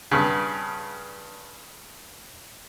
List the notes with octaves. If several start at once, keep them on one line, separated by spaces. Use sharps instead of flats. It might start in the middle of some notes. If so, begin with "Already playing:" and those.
G2 C#3